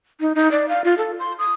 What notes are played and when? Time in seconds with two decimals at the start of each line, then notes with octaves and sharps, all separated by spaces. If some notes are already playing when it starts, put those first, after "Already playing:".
0.20 D#4
0.35 D#4
0.51 D5
0.69 F5
0.84 F4
0.98 A4
1.19 C6
1.39 D#6